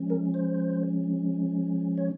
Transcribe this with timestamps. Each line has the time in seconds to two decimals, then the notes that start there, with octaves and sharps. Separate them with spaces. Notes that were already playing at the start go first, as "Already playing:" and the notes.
Already playing: F3 G#3 C#4
0.10 A#4
0.34 C5
1.98 C#5